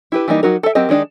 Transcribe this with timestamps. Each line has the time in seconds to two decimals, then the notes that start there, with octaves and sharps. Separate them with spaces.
0.12 E4 G4 B4
0.28 E3 G3 A#3 D#4
0.43 F#3 D#4 F#4 A#4
0.63 A4 E5
0.75 F#3 C4 G4 A#4 D#5
0.89 D#3 G#3 D4 D#4